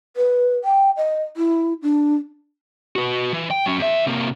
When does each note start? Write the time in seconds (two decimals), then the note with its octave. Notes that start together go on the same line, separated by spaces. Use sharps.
0.16 B4
0.64 G5
0.97 D#5
1.37 E4
1.82 D4
2.96 F#4 B4
3.33 E3
3.51 G5
3.66 F#3 C#4
3.78 E2 E5
4.07 C3 A#3